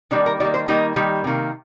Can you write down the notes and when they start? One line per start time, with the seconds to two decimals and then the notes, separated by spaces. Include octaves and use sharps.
0.11 D#3 G3 A#3 D4
0.26 A#4
0.40 D#3 G3 A#3 D5
0.54 C5
0.68 D#3 G3 A#3 D#4
0.96 D#3 G3 A#3
1.24 C3 D#3 A#3